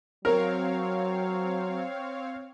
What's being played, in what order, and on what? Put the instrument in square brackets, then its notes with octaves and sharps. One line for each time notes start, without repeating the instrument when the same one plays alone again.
[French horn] F#3 [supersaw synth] C4 C#5 F5 [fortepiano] A#4